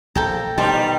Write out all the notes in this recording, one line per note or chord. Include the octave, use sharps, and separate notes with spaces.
A#1 A4 G5 A#5
B2 D#3 G3 C5 A5